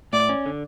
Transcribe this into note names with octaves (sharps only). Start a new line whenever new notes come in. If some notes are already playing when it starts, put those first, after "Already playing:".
A2 D5
C#4
D3